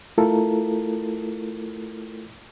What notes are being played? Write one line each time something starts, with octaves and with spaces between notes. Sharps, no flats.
A3 E4 F4 A4 A#4